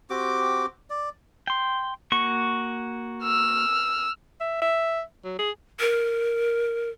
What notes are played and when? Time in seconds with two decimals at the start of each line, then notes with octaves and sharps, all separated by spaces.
0.10 C4 F#4 G4 D6
0.90 D5
1.47 G5 C6
2.12 A#3 F#4 C#6
3.24 E6 F6
4.41 E5
4.62 E5
5.24 F#3
5.39 G#4
5.80 A#4